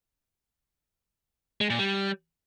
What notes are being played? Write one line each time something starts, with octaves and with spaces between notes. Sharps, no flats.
G#3
A#2
G3